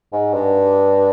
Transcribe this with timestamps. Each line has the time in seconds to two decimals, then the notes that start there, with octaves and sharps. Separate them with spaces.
0.12 G#2
0.33 G2